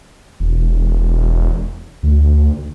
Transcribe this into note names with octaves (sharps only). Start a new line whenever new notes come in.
E1
D2